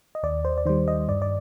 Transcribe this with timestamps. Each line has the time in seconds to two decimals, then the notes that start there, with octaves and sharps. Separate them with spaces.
0.15 D#5
0.23 D#2 D5
0.45 C5
0.58 D5
0.66 D#3 G3 C5
0.88 D#5
1.08 G2 D5
1.22 D5